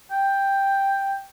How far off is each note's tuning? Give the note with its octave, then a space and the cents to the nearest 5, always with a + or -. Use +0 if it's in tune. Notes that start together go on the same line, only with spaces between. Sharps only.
G5 +5